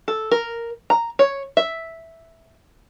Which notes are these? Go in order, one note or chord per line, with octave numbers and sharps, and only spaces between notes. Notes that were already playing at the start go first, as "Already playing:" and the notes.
A4
A#4
A#5
C#5
E5